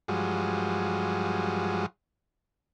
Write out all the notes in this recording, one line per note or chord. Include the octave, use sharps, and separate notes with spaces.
G2 F3 F#3 G#3